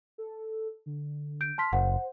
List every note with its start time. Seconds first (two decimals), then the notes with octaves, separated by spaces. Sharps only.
0.18 A4
0.86 D3
1.41 G6 D7
1.58 A5 C6 F6 B6
1.73 F#1 C5 F#5